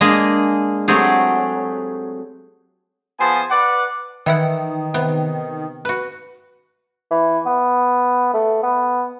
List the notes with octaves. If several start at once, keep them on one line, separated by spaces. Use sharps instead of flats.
G#3 A#3 D4 G#4 D#5
F#3 A3 C4 G4 G#4
F3 B3 G#4 C5 G#5 A5
B4 D5 F#5
D#3 E3 E4 F#5
C3 B3
F#4 B4
E3
B3
A3
B3